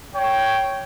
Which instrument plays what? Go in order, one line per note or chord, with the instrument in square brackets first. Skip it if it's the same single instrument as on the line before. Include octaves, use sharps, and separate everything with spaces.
[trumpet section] C#5 G5